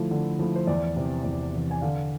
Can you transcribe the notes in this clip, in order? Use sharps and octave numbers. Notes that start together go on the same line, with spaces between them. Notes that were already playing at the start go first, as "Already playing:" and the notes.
Already playing: D3 F3 A3 E4
D3
F3 A3 E4
C5
E2 D5
C3 E3
E2
C3 E3
G#5
D3 F5